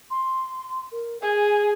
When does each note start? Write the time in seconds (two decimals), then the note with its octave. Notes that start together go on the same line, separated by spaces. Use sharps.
0.10 C6
0.92 A#4
1.22 G#4 G#5